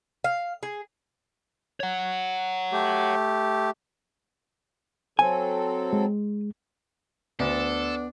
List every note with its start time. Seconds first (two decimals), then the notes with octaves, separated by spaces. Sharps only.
0.24 F5
0.63 G#4
1.80 C#5 F#5
2.72 A3 G4
5.19 F#3 C4 A4 G#5
5.93 G#3
7.40 D2 B3 D4 A4